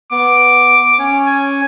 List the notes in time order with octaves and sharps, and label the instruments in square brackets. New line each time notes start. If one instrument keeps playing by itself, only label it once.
[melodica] B3 [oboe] D6
[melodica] C#4 C#5
[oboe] G#5